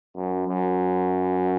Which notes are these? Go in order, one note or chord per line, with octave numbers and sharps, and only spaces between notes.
F#2
F#2